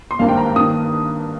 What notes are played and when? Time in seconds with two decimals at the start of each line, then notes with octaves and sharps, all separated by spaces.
0.11 C6
0.19 G#1 G2 G3 A#3 F5
0.28 G5
0.37 A#5
0.55 G2 D#3 A#3 D#6